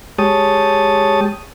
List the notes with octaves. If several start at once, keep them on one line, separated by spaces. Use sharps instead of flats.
G#3 G4 C#5 A5 D#6